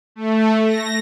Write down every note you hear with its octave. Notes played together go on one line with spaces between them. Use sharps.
A3
A#6